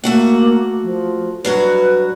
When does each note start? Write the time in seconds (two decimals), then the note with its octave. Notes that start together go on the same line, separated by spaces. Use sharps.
0.04 A3 A#3 F#4 F#5
0.83 F3
1.45 G2 F#3 F#4 B4